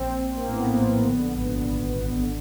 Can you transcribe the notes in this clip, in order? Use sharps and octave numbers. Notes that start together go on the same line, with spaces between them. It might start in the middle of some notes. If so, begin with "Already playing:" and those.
Already playing: A#1 C4
A#1
A#3
A2 B3
A#1
D3
G#1
G#1
G#1
D3